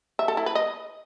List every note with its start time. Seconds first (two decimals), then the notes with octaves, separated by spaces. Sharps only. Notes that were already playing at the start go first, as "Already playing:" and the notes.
0.19 E5
0.28 A4
0.37 E4
0.46 B4
0.55 D#5